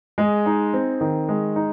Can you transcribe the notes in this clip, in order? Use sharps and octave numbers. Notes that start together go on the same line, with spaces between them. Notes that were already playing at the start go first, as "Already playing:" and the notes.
G#3 G#4
D#4
C4
D#3
G#3
D#4